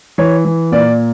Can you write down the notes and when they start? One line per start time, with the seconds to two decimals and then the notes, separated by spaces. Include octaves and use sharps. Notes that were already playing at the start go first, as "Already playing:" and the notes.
0.18 E3 C#5
0.45 E3
0.72 A#2 D5